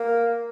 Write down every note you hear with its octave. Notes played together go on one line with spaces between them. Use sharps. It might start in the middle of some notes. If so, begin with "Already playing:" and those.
Already playing: A#3